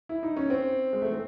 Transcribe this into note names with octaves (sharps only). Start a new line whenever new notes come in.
E4
D#4
C#4
C4
G#3
A3
C4